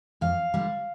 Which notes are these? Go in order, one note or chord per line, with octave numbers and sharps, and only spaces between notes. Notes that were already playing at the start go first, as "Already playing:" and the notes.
F2 F5
D3 G3